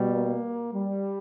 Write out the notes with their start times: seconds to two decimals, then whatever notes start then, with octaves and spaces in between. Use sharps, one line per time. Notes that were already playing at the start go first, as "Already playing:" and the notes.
Already playing: B2 G3
0.12 A#3
0.74 G3